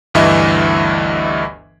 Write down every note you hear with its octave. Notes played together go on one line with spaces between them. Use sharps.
G1 D2 G2 E3 D#5 E5